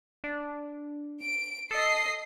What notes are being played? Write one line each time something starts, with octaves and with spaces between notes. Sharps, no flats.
D4
D7
A4 D#5 C7